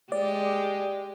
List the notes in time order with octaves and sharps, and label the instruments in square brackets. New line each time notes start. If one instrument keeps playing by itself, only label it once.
[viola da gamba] G#3 G4 [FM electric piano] D5